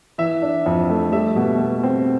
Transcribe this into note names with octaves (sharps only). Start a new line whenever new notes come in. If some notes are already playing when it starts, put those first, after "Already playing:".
E3 E5
D4
F2
A3
G3 E5
B2
B2
C4